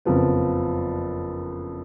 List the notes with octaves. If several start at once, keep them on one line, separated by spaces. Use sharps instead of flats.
F#1 F2 F3 B3